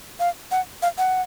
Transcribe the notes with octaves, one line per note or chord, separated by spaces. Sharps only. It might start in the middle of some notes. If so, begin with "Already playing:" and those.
F5
F#5
F5
F#5